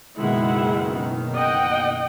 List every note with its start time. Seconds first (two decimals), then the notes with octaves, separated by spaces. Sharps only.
0.18 F#1 B2 D#3 G#3 E4 F#5
1.35 D#5 F#5 G5